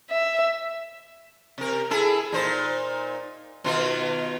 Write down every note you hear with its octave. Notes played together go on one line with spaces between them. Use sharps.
E5
C3 A#4
E4 G#4 A4
A#2 D#4 C5
B2 D#3 F4